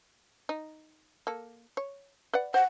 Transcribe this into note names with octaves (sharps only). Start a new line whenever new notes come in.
D#4
A#3 A4
C#5
B4 D5 F#5
C5 F#5